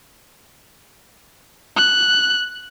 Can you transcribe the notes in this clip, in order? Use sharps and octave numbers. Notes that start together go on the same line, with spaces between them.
F#6